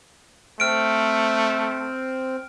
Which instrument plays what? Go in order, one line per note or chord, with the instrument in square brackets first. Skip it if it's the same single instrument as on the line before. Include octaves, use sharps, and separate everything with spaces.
[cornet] A3 [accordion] C4 [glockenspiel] F6 D7